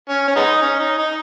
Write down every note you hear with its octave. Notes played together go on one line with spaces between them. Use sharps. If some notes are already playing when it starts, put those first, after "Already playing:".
C#4
C#4
G#3 B3 D#4
C#4
D#4
D#4